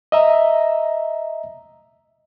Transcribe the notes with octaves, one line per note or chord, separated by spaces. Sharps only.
D#5 E5 A#5